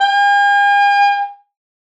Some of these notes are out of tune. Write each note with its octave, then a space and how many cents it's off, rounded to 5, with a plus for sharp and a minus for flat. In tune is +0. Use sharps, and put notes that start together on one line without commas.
G#5 -45